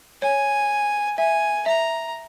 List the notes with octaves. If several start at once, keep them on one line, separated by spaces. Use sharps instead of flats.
C#5 G#5
E5 G#5
E5 A#5